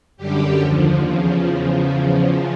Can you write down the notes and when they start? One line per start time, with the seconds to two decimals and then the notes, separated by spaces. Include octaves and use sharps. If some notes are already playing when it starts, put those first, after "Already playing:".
0.17 F#2 D3 G3 G4
0.59 D#2 D3 F3
1.00 E2 C#3 F3